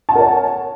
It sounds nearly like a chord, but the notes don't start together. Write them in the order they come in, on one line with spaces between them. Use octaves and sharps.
A5 F#5 A#4 C#5 G#5